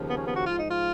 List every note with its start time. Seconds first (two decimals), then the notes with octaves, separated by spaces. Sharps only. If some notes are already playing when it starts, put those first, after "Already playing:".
Already playing: D#2 C#3 F3
0.08 B3
0.18 C#4
0.27 B3
0.36 F#4
0.45 G#2 F3 F4
0.58 D#4
0.71 F4